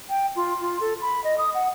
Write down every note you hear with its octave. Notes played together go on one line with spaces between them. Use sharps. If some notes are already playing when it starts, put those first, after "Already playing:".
G5
F4
F4
A4
B5
D#5
D#6
F#5